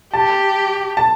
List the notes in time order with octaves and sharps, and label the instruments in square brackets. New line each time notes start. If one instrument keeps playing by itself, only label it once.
[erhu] G4 [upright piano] A5
[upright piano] A5